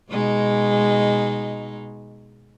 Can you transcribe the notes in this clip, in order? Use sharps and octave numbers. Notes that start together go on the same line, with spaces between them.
B2 G#3 D#4